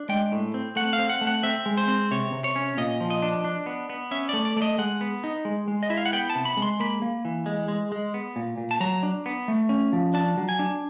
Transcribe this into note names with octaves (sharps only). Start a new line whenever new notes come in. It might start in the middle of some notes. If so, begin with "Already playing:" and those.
Already playing: D4
G#3 G5
A2
C4
A3 F#5
F5
C4
F#5
A3
F#5
C4 E5
G#3
C5
C4
C3 C#5
C3
C#5
C#4
A#2 D#5
F3
D#5
D4
D4
B3
B3
C#4 E5
A3 D5
D5
A3 D5
D#5
G#3 F#5
B3
D#4
G#3
G#3
D#5
E4 E5
F5
F#5
B3 G5
A5
C3
B5
G#3
C6
A#3 B5
A#3
E3
G#3
G#3
G#3
B3
A#2
A#2
A5
F#3 A#5
D4
B3
A3
C#4
F3
D4 A5
F#3
G#5
D4